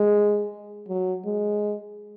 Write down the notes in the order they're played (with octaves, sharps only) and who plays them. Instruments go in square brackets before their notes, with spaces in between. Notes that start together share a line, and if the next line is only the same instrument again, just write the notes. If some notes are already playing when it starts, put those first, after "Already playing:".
Already playing: [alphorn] G#3
F#3
G#3